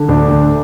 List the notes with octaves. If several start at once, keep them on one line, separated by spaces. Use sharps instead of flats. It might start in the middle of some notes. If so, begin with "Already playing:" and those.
Already playing: D3
D2 D4
D2